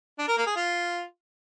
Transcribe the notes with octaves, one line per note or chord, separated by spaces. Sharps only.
D4
A#4
A#3
G#4
F4